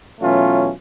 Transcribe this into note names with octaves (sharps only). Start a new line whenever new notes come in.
B2 E3 F#3 A3 C#4 F4